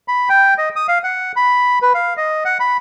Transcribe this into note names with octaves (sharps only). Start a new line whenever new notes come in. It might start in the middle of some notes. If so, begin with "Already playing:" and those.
B5
G5
D#5
D#6
F5
F#5
B5
B4
F5
D#5
F#5
B5